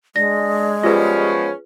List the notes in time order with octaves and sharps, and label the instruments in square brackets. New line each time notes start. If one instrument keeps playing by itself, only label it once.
[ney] G#3 [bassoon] D4 [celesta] A#6
[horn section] F3 B3 C#4 [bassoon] G3 [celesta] F4 G#4 B4